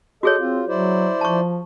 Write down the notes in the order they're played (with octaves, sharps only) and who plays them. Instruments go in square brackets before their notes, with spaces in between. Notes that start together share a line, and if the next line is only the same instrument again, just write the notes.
[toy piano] F#4 G#4 C#5 [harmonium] A4 D#5
[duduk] C4 [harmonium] F4
[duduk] F#3 [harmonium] E4 C5 D5
[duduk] F3 [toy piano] A5 C#6